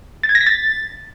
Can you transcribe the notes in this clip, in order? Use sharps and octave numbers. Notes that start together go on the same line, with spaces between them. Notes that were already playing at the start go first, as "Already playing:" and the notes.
A6
G#6
A#6
B6
A6